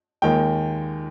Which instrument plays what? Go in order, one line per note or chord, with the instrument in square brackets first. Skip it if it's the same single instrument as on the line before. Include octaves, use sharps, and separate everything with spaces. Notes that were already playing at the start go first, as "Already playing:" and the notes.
[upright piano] D#2 D#3 G#3 G5